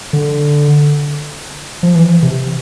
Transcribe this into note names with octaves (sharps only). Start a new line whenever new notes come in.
D3
F3
E3
C3